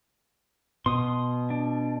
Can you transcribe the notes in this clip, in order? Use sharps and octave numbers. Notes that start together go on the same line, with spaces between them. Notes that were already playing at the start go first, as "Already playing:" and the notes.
B2 C6 D#6
D4